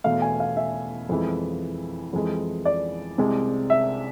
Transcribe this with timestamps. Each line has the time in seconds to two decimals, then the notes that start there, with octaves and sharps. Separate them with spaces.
0.04 E2 B2 A3 F5
0.22 G#5
0.40 F5
0.57 E5
1.09 F2 E3 G#3
2.13 F2 E3 G#3
2.65 D5
3.18 C2 C3 G#3
3.70 E5